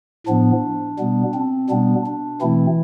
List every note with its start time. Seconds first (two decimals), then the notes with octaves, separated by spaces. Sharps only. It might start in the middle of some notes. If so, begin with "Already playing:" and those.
0.27 A2 F3 B3 D4
0.99 B2 G3 B3
1.34 C4
1.70 B2 G3 B3 D4
2.06 D4
2.41 B2 E3 A3 C4 E4